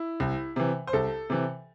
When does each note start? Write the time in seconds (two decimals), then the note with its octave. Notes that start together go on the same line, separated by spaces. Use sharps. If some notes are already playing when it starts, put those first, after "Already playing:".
Already playing: E4
0.20 C2
0.56 C3 E3
0.87 C5
0.93 C2 A4
1.30 C3 E3